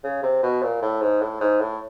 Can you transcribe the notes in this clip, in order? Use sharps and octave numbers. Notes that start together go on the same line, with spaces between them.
C#3
C3
B2
A#2
A2
G#2
A2
G#2
A2